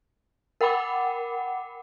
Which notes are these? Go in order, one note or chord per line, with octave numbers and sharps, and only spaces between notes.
A#4 F#5 G5 B5 D6